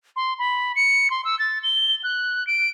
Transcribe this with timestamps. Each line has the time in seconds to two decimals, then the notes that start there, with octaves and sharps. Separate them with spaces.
0.16 C6
0.39 B5
0.76 C#7
1.10 C6
1.25 E6
1.39 A6
1.63 G7
2.04 F#6
2.47 D7